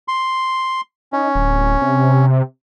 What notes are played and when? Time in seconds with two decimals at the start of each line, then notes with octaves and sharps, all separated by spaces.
0.08 C6
1.13 C#4 D#4
1.35 D1
1.82 C3